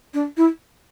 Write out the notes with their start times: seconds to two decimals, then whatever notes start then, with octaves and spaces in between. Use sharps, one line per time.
0.14 D4
0.37 E4